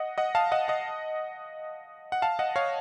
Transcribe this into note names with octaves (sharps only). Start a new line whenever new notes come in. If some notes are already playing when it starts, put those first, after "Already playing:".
Already playing: D#5 F#5
D#5 F#5
F5 A5
D#5 F#5
D#5 F#5
F#5
F5 A5
D#5 F#5
C#5 F5